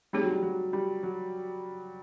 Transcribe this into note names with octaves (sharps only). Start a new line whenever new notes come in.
G3 A3 C4 D#4 G#4 C#5
F#3
G3
F#3
G3
F#3